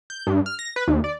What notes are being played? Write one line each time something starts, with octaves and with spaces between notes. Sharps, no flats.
G6
G2
F6
A#6
B4
D#2
D5